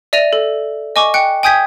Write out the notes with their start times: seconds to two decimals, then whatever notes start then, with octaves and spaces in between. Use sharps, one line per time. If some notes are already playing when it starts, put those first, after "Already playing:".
0.13 D5 E5 A#6 D#7 F7
0.33 A4
0.96 D#5 G#5 C#6 D6
1.14 G5 F#6 C#7
1.43 G5 G#5 D#6 G6 G#6 B6